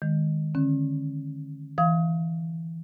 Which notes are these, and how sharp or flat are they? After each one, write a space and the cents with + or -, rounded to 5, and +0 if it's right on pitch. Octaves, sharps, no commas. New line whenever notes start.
D#3 +0 G#3 +0
D3 +0 C#4 -30
E3 +0 F5 +0 D#6 +30